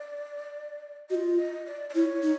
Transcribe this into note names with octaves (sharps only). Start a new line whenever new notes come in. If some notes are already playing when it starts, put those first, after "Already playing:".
Already playing: D5
F4 F#4 D#5
D#5
D5
D5
E4 C#5
D#4